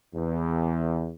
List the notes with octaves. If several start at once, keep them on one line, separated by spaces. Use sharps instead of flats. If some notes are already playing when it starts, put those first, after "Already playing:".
E2